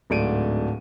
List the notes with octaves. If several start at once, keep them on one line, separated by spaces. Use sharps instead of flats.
D1 G#2 A3 D4 D7 D#7